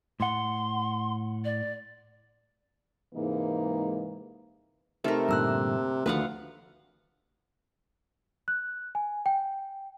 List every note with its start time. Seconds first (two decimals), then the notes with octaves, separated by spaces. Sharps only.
0.20 A2 F#5 C6
1.44 D5
3.15 G#2 C3 E3 G#3 A#3 D#4
5.04 C3 A3 D#4 A#4 B4
5.29 G2 A#2 D3 A#5 E6 F#6
6.06 D2 D#3 F3 A3 B4 F5 F#5
8.48 F#6
8.95 G#5
9.26 G5